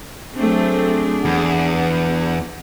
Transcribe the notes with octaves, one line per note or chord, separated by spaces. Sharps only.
F#3 A3 C4 D4 G#4
E2 F#5